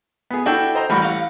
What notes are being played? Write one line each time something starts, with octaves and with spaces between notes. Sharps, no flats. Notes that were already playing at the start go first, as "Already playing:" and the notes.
B3 G#4
D4 E4 F#4 A4 G5
C5 D#5 A#5
A1 G3 F#4 G5 B5
F5 F#5